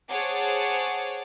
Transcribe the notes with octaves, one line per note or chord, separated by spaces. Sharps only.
G#4 C5 C#5 F#5 A5 D6